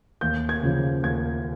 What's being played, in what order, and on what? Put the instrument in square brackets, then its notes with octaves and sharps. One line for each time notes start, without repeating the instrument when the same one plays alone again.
[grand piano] D#2 G6
G#6
C#3 F3
D#2 G#6